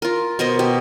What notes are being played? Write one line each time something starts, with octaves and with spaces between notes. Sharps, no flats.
F4 A#4
B2 A#4 C5 D#5
B2 G4